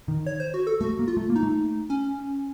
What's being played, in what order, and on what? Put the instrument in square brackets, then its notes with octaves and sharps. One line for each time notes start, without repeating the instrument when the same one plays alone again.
[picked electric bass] D#3
[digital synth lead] C#5
C5
F#4
A4
[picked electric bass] A3 [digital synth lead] F#4
[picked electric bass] A#3
[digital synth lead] F4
[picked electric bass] A3
A#3
[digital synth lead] D#4
[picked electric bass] A3
[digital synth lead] C#4